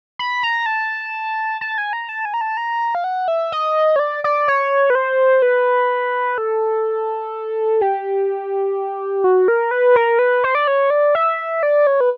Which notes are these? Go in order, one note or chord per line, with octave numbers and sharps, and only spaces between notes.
B5
A#5
A5
A5
G#5
A#5
A5
G#5
A#5
A5
A#5
F5
F#5
E5
D#5
C#5
D5
D5
C#5
B4
C5
B4
A4
G4
F#4
A#4
B4
A#4
B4
C5
D5
C#5
D5
E5
D5
C#5
B4